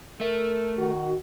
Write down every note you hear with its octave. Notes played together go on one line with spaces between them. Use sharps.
A3 A#4 E5
D#3 F#4